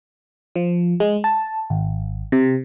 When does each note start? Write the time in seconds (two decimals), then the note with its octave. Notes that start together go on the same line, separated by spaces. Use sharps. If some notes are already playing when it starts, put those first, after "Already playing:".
0.56 F3
1.00 G#3
1.24 A5
1.70 G#1
2.32 C3